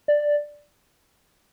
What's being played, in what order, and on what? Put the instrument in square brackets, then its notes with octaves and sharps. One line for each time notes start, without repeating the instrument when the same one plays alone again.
[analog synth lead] D5